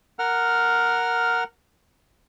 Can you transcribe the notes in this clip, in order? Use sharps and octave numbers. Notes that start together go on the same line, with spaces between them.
A#4 F#5 F6